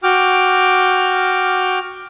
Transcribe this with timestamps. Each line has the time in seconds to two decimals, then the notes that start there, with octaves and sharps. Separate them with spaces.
0.03 F#4 G5 D6 F6